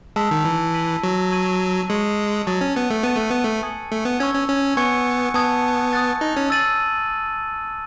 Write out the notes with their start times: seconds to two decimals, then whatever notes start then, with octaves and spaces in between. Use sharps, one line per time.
0.16 G#3 A5 E6 B6
0.31 D#3
0.45 E3
0.74 F#6 B6 D#7 F#7
1.03 F#3
1.32 A5 C#6 G#6 D#7 F#7
1.89 G#3 C#6 G#6 C#7 F#7
2.47 F#3 A5 D#6 A6 D#7 F#7
2.61 C#4
2.76 B3
2.90 A3
3.03 B3 A5 C#6 F#6 A6 D#7
3.16 A3
3.30 B3
3.44 A3
3.63 G#5 D#6 G#6 C#7 F#7
3.92 A3
4.05 B3
4.20 C#4 C#6 E6 G#6
4.34 C#4
4.48 C#4
4.77 B3 G#5 C#6 G#6 C#7
5.34 B3 A5 D#6 G#6
5.93 D#6 F#6 A6
6.21 D#4
6.37 C#4
6.50 E6 A6 D#7 F#7